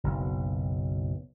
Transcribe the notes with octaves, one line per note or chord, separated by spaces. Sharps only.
F#1 B1